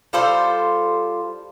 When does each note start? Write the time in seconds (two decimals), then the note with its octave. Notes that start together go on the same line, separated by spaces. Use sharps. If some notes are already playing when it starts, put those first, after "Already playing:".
0.13 G3 F4 A4 C5